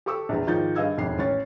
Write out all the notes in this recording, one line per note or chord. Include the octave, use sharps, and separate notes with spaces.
G4 A4 C#6 D6 E6
A#1 E2
G#2 D#3 F3 G6 A6
G2 G#4 D#5 F5 E6 G#6
E1 F2 G#2 C7
A1 C#4 C#5 A6